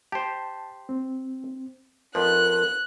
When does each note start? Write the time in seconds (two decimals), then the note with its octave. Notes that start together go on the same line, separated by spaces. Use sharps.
0.12 G4 C5 A5
0.89 C4
2.15 F2 F3 A#4 B4 F#6